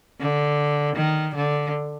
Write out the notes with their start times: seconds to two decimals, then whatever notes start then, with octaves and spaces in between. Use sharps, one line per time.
0.20 D3
0.96 D#3
1.35 D3